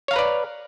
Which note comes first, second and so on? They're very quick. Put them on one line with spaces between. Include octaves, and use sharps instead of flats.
C#5 F5 A#5 B4 D5